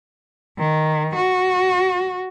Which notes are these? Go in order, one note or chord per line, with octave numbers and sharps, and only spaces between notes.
D#3
F#4